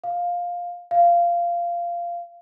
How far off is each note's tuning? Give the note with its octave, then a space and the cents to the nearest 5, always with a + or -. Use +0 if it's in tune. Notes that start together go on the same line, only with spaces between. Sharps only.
F5 +10
F5 -15